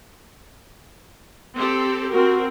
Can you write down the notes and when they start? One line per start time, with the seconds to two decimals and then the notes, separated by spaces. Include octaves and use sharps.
1.55 C4 G4 A4
2.11 C4 F#4 A#4